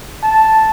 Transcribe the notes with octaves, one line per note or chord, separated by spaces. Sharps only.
A5